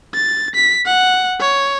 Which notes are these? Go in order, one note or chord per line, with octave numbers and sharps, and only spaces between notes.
A6
B6
F#5
C#5